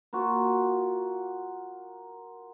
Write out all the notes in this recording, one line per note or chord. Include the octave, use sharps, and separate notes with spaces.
A#3 F4 F#4